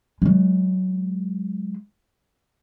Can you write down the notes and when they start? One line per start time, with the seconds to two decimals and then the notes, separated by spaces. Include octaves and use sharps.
0.22 F#3 G#3